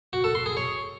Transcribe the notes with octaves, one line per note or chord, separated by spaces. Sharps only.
F#4
A4
C6
G#4
C#5